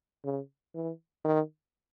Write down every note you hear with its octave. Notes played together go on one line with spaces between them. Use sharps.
C#3
E3
D#3